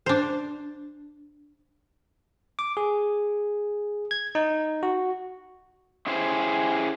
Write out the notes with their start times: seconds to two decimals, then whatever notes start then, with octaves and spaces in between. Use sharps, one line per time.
0.06 D4 C5
2.59 D6
2.77 G#4
4.11 G#6
4.35 D#4
4.83 F#4
6.07 C#4 E4 G4 G#4 C5